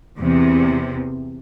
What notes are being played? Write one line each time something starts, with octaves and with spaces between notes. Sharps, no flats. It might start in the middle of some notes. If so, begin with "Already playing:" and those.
E2 C3